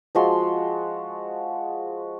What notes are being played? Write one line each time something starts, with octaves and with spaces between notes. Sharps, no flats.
F3 G#3 F#4 C6